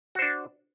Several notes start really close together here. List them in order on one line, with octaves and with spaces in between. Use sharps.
F#4 C5 D4